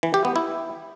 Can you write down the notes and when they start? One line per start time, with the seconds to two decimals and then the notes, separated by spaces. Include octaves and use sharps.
0.03 E3
0.14 G4
0.25 B3
0.36 E4